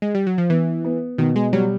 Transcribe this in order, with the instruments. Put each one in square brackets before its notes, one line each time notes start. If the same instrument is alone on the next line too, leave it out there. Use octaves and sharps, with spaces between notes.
[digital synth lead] G#3
G3
F#3
F3
[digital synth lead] E3 [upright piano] B3
[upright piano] B3
[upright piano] B2 [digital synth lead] D#3
[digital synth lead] G#3
[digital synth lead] F#3 [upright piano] G3